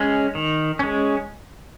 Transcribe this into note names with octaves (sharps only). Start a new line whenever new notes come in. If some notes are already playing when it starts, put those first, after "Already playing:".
Already playing: G#3 C#4
D#3
G#3 C#4